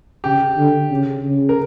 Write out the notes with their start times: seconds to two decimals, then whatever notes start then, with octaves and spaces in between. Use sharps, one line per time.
0.24 C#3 G4
0.57 D3
0.91 C#3
1.24 C#3
1.49 A#4